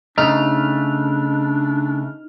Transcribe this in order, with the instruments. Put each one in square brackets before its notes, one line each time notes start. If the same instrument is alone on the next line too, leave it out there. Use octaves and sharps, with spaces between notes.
[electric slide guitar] C#3 A3 [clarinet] D4 [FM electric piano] D#4 F6